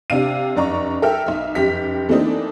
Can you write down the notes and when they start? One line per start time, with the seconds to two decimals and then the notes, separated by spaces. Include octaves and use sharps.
0.10 C3 D4 F5 D#7
0.56 F1 F#2 D5 A#5 C#6
1.02 A4 A#4 E5 G5 F6
1.26 B1 E5
1.55 F1 F#2 G4 B6
2.09 E3 A3 A#3 C4 D4 D#4